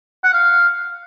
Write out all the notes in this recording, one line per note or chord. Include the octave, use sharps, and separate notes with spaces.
F#5
F5